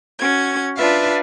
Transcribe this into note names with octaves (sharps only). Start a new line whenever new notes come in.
C#4 F#4 G#6
D4 F4 B4 E5 F5